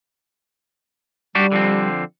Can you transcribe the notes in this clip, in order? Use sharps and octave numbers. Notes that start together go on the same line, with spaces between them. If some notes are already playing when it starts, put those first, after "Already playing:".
G3 D4 F#4 G4
D3 F3 C4